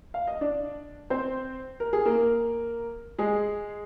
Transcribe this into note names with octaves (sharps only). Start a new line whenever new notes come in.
F5
D#5
D4 D5
C4 C5
A#4
G#4
A#3 A#4
G#3 G#4